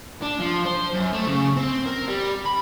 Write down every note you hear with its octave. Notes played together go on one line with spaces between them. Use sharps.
D4
F3
C5
F#2
A3
C#3
C4
A#4
G3
B5